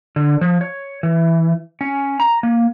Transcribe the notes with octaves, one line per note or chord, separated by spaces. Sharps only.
D3
F3
C#5
E3
C#4
A#5
A#3